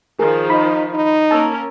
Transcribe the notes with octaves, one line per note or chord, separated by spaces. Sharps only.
D#3 F3 G#4 A#4
D#4 B5
D#4
A#3 C#4 A#4 A5 E6